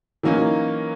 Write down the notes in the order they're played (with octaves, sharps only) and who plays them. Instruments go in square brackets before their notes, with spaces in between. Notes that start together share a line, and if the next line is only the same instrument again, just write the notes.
[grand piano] E3 F#3 A#3 C#4 D#4